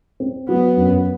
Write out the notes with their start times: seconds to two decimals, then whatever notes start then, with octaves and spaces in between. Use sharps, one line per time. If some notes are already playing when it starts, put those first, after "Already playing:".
0.20 C4
0.49 F#3 B3
0.77 F#2